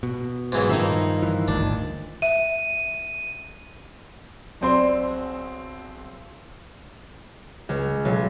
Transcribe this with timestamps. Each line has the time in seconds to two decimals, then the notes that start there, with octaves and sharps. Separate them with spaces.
0.03 B2
0.52 G#2 E3 F#3
0.69 G2 D#3 F3 D#4 E5
1.22 E3
1.48 D#1 G#1 D2 D4
2.22 E5 D#7
4.61 B1 C4 D5 G#5 C6
5.06 F#4 G#4 F#5
7.69 C#2
8.05 B1